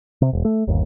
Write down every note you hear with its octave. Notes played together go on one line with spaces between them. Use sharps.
C3
E1
A3
G1 D#2